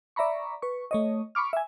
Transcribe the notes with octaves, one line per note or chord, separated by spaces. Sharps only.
D5 E5 A#5 B5 C#6
B4 C#6
A3 C#5 D#5
B5 C#6 D6 F6
E5 G#5